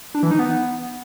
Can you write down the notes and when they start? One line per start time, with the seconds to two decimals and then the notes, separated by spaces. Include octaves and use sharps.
0.15 D4
0.23 E3
0.31 D#4
0.39 B3